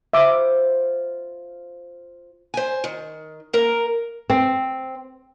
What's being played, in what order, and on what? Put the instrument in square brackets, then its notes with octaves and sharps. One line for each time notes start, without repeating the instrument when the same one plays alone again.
[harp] F4 C5 [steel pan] E5 D6
[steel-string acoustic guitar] C5 G#5
D#3
A#3 A#4
[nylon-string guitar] C4